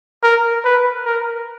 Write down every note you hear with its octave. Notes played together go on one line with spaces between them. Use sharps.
A#4
B4
A#4